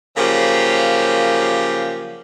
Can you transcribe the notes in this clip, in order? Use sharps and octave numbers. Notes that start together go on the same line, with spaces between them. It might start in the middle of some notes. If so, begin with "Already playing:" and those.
C#3 F3 F#3 A#3 G4